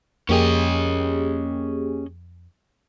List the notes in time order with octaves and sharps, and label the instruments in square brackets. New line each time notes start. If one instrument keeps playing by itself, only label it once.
[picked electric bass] F2 [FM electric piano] A#3 G4 G#4 [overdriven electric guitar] C#4 D#5